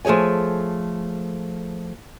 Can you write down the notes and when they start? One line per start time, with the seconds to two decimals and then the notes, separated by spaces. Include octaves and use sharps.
0.05 F3 A3 G#4 C#5 G#5